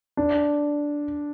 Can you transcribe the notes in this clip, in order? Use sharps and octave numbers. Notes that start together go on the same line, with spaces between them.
D4